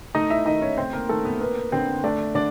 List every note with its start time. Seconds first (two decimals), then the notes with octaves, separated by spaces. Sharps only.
0.15 A3 D#4 D#5
0.30 E4 E5
0.46 D#3 D#4 D#5
0.61 C#4 C#5
0.77 C4 C5
0.93 A#3 A#4
1.09 D#3 A3 A4
1.25 B3 B4
1.41 A#3 B3 B4
1.72 D3 C4 C5
2.04 A3 D4 D5
2.35 D3 D4 D5